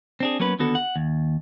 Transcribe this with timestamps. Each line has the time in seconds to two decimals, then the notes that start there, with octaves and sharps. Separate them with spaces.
0.20 C4 D4 G#4
0.40 F#3 A#3 B3 C#4 B4
0.59 D#2 D3 B3 F#4 A4
0.75 F#5
0.96 D#2